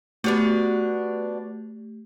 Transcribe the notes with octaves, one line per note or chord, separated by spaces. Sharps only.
A3 B3 D4 F#4 G4